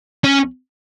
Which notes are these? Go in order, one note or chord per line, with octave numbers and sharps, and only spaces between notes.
C#4